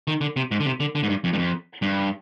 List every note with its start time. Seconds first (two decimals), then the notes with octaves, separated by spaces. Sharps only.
0.08 D#3
0.21 D3
0.36 C3
0.51 G#2
0.60 D3
0.66 C3
0.80 D3
0.95 D3
1.03 G#2
1.09 G2
1.24 F2
1.33 G2
1.38 F2
1.82 G2